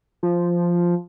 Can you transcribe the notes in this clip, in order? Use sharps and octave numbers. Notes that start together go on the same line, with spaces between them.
F3